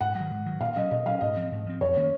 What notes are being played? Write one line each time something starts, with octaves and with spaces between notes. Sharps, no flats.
G#2 F#5
F#3
D#3
G#2
D#3 F#3
A#2 F5
F#3 C#4 D#5
A#2 D#5
F#3 C#4 F5
G#2 D#5
F3 C4
G#2
F3 C4
F2 C#5
D#3 A#3 C#4